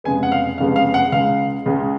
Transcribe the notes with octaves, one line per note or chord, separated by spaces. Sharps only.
F1 F2 C#3 G#3 B3 G#5
F#5
F5
F1 F2 C#3 G#3 B3 F5
F5
F#5
C#2 C#3 G#3 F5
C#2 C#3 G#3